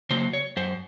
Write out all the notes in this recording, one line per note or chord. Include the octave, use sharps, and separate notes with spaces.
C#3 F#3 A#3 C5
C#5
F#2 C5